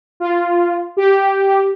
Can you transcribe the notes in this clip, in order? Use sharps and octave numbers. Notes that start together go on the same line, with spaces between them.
F4
G4